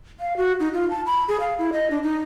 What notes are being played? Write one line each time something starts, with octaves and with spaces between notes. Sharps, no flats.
F5
F#4
D#4
F4
A5
B5
G#4
F5
E4
D#5
D4
D#4